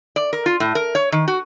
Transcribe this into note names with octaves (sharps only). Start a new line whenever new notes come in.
D5
A#4
F4
A2
A#4
C#5
D#3
F#4